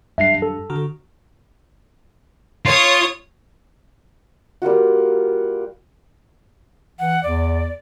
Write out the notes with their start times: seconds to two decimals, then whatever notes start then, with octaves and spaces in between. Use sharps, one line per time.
0.18 F#2 G3 D4 E5 C7
0.42 A4
0.70 D3 F#4 A#5
2.65 F4 C#5 D#6
4.62 G3 A#3 F4 F#4
6.99 E3 F#5
7.23 E2 D5